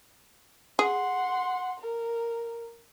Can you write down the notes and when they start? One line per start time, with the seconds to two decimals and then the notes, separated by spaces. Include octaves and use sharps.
0.79 G#4 F#5 C6
1.79 A#4